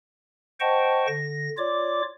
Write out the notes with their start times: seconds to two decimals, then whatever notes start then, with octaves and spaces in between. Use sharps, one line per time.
0.60 C5 D#5 F#5 G5 A5 C#6
1.08 D3 A#6
1.58 F4 C#5 D5 D6